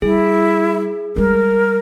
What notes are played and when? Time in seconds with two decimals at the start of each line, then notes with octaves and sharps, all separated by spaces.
0.02 G3 E4 G#4
1.16 G3 G#3 A#4